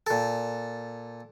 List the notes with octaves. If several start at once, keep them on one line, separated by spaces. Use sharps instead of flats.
A#2 A4